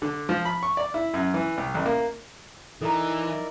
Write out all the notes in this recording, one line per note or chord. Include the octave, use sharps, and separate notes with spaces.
D3
F3
B5
C#6
D5
E4
F#2
E3
C2
A1
A#3
E3 D#4 E4 A4 A#4 D5 A#5